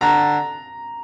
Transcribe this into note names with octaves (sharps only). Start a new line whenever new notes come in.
D3 A#5